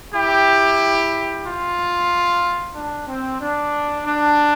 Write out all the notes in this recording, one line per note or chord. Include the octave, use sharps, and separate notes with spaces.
E4 G4
F4
D4
C4
D4
D4